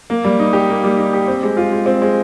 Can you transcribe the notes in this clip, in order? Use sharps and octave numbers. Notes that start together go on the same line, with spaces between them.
A#3
G3
D#4
G4
A#3
G3
D#4
G4
C4
G#3
F4
G#3
C4
G#3